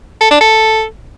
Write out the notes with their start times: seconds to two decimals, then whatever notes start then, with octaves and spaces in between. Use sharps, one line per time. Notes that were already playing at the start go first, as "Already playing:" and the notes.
0.21 A4
0.31 D4
0.41 A4